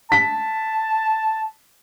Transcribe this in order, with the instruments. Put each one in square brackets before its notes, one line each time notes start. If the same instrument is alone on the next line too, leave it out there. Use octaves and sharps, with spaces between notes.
[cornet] A5 [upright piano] B6